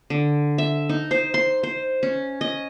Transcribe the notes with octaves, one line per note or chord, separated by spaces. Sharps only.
D3
E5
D#4
C5
C6
C5
C#4
D#5